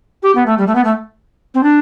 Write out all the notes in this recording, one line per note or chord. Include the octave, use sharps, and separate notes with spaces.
G4
B3
A3
G3
A3
B3
A3
C4
D4